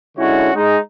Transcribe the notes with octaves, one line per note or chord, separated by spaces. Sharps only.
D3 G#3 C#4 E4 F#4 C#5
G#3 D#4